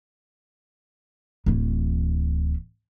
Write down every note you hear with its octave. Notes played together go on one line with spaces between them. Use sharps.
D1 E3